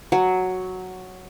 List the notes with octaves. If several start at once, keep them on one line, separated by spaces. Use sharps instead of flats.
F#3